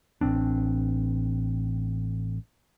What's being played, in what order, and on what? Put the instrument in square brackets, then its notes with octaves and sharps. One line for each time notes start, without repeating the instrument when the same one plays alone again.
[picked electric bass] A1 C4 D4